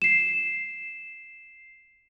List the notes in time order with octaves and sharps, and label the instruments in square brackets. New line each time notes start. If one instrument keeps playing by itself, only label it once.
[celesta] C7 E7